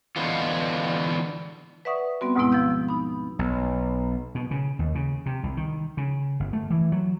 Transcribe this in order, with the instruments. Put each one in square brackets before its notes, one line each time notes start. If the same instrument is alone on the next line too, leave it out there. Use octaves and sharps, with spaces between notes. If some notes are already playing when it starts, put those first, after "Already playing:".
[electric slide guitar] D3 E3 G#3 B3 F4
[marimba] B4 D5 E5 F#5 C#6 D#6
G3 B3 C4 F#4
D2 G#2 B2 G#3 B3 E4
F3 B3 E6 G6
D#4 B5
[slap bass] B1
B2
C#3
D#2
C#3
C3
C2
D#3
C#3
G1
A3
E3
F#3